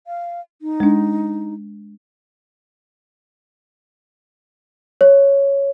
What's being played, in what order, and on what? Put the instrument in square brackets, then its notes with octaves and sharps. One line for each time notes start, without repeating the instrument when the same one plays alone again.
[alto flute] F5
D#4
[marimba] G#3 D4
[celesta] C#5